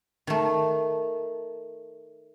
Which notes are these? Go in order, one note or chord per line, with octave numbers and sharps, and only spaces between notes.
D#3 A3